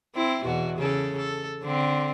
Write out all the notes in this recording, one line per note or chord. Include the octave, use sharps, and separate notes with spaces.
C4 E4
E2 B2 F#4
C#3 A4
A4
D3 C4